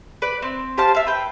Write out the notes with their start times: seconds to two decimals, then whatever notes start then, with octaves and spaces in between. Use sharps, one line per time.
0.22 B4 D5
0.42 C4
0.78 G4 C5 F5 A5
0.95 E5 F5
1.07 B4 G5